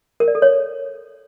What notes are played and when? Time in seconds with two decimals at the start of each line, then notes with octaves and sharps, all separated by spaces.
0.20 A#4
0.28 D5
0.35 A4
0.42 C#5